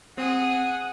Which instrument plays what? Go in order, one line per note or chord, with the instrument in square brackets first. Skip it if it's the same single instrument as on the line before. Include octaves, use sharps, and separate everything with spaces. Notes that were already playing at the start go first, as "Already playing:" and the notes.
[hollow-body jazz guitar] C4 [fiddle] G#4 D#6 [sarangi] F#5